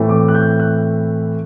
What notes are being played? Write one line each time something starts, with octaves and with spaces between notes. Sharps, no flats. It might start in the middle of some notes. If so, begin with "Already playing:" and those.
Already playing: A2 E3 A3 C4
D6
F#6
G6
F#6